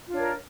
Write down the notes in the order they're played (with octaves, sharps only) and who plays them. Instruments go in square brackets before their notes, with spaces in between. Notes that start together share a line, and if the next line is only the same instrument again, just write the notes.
[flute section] F4
D4
C#5
A#4